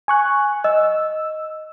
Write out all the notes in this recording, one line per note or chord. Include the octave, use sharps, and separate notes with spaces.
G#5 C#6 F#6
D#5 E6